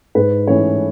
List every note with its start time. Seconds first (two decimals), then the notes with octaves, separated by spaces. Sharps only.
0.15 G#2 B4
0.47 E3 A3 C#4 C#5